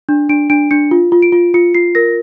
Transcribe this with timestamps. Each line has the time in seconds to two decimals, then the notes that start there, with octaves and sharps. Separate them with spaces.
0.09 D4
0.29 D4 D7
0.50 D4 D7
0.71 D4 C#7
0.91 F4
1.12 F4
1.22 D7
1.32 F4
1.54 F4 C#7
1.75 F4 C7
1.95 A#4 A#6